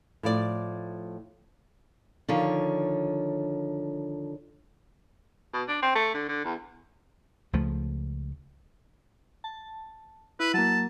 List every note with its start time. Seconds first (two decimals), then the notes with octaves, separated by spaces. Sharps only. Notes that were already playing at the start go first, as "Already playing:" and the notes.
0.23 A2 F3 D5
2.28 D3 D#3 F3 C#5
5.53 B2
5.68 D4
5.82 C4
5.95 A3
6.14 D3
6.28 D3
6.45 E2
7.53 C#2 F3 A3
9.44 A5
10.40 E4 B4
10.54 F#3 A#3 A5